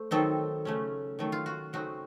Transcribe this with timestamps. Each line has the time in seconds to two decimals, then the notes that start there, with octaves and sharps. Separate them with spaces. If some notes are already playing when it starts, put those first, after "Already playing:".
Already playing: A3 C5
0.11 D#3 F#3 C4 D#4 A4
0.65 C#3 A3 C#4
1.19 D#3 F#3 A3
1.32 F4
1.46 F#4
1.73 C#3 F#3 A3 C4 D#4 F#4